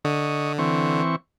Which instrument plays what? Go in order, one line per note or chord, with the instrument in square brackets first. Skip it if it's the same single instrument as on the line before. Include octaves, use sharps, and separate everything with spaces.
[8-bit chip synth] D3 [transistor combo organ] D#5 C#6
[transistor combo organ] E3 C4 C#6